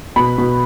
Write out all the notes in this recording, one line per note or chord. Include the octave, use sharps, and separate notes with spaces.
B2 B5
B2